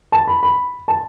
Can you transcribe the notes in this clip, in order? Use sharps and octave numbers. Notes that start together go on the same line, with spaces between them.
A5
B5
B5
A5